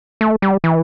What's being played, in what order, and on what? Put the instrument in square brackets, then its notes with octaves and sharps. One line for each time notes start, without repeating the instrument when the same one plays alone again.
[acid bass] A3
G3
E3